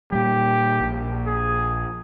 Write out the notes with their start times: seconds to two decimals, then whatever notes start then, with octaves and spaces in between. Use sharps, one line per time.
0.12 A#2 G3 G4
0.81 A#1
1.26 G#4